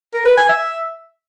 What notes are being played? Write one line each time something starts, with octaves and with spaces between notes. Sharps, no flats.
A#4
B4
G#5
E5